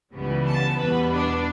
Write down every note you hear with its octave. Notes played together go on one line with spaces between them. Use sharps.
C#2 C#3 E3 G3 B3
A5
E2 B2 G3 B3 B4
D4